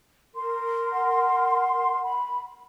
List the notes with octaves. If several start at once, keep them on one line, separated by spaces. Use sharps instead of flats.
A#4 C6
F#5
B5